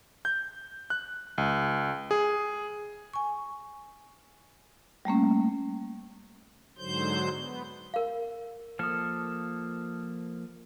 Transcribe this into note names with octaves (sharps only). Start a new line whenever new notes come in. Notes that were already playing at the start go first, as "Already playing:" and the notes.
G6
F#6
C#2
G#4
G#5 C#6
G3 A3 A#3 C#4
G#2 D3 F#3 C5 G6
B3
A#4 F5
F3 A#3 A4 D#6 F6